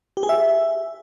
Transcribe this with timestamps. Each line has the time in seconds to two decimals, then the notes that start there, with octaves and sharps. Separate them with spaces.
0.17 G4
0.23 G#4
0.29 E5